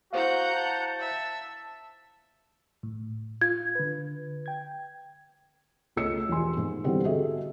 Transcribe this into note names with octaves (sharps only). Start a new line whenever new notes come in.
E4 F#4 C5 F5 F#5 A#5 G6
A5
E5
A2
F4 G#6
D3 B4
G5 G#6
C#2 A3 C#5 D#5 E6 C#7
E1 F3 G4 G#5 C6
G#2
B2 D3 E3 G3 B3 C4
F#4 G#4 A4 D#5 E5